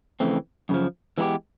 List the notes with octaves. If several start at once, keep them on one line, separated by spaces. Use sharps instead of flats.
F2 C#3 E3 A3 C4
F#2 C#3 F3
E3 G#3 B3 D#4 G4